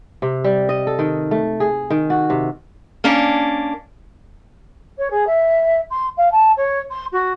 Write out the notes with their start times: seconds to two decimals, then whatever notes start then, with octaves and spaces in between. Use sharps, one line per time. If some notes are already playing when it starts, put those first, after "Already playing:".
0.22 C3
0.44 G3
0.69 D#5
0.87 A4
0.99 D#3
1.31 A3
1.60 G#4
1.90 D#3
2.10 F#4
2.30 C3
3.04 A#3 C#4 D4
4.98 C#5
5.10 G#4
5.26 E5
5.90 C6
6.17 F5
6.31 A5
6.57 C#5
6.90 C6
7.12 F#4